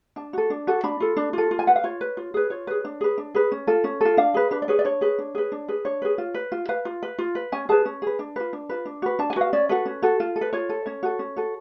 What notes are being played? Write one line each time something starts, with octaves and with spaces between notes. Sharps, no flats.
D4 A5
F#4 A4
D4
F#4 A4
D4 B5
F4 A4
D4
F4 A4
F4
G#5
B4 F#5
F5
F4 C#5
B4
F4
G#4 B4
F4 C#5
G#4 B4
D4
G#4 B4
D4
G#4 B4
C#4
F4 A4
C#4
F4 A4
D4 F5
G#4 B4
D4 B4
D5
G#4 B4 C#5
D5
D4 C#5
G#4 B4
D4
G#4 B4
D4
G#4 B4
D4 C#5
G#4 B4
F4
B4
F4
B4 F5
F4
B4
F4
B4
C#4 G#5
G#4 B4 A5
C#4
G#4 B4
D4
F4 B4
D4
F4 B4
D4
F#4 B4
D4 A5
G#5
F#4 B4 F5
C#4 D5
F#4 A4 B4
C#4
F#4 A4
F4
A4
B4
F4 C#5
A4
C#4 C#5
F#4 A4
C#4
F#4 A4